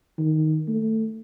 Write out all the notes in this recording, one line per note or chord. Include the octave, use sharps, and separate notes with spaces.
D#3
A3